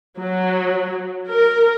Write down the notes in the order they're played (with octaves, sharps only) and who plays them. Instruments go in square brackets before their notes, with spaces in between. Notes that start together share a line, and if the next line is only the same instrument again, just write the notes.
[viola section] F#3
A#4